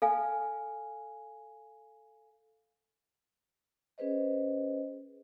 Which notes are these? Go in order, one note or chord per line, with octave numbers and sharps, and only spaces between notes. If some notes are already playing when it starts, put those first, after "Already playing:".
A4 F5 G#5
C#4 G#4 B4 C5 D#5